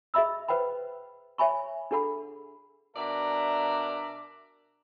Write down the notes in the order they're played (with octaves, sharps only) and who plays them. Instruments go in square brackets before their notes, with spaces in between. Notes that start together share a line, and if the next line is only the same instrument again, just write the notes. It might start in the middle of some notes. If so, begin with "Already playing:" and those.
[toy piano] G#4 D#5 E5 B5 E6
B4 C5 F#5 G5 B5
C#5 E5 G#5 B5 C#6
D4 G#4 A4 F#5 B5
[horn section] B2 D4 A#4 D5 E5 A#5